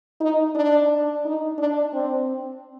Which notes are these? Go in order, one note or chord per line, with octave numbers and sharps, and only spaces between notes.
D#4
D4
D#4
D4
C4